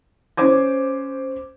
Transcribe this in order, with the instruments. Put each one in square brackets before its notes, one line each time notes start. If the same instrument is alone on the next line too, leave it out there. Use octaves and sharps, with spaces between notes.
[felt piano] C#4 C5 D6 G#6